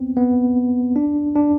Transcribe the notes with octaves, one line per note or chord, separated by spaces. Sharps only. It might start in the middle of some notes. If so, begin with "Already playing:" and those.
Already playing: B3 C4
B3
D4
D4